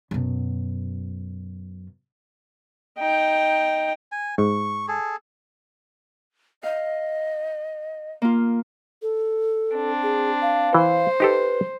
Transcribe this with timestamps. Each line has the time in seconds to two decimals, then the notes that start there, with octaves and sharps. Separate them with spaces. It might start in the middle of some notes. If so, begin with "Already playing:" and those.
0.11 F#2 B2
2.99 D#4 G5
4.12 G#5
4.38 G#2 C#6
4.88 G#4 A4
6.63 D#5 F5
8.22 A#3 F4
9.02 A4
9.74 C4 D4
10.03 G#4
10.42 F5
10.74 E3 C5
11.20 D#4 G4 A4 B4